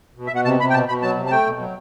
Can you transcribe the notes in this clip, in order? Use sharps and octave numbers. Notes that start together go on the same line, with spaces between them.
B2
E5
B2 F#5
C3 A5
C3 B5
G5
B2 A5
B2 B5
F#3 A5
C3
A5
A3 G5
B2
F#3